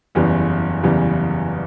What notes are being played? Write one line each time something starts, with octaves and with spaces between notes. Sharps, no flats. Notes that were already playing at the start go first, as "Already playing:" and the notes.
F#1 E2 C#3 E3 G3
F#1 E2 C#3 E3 G3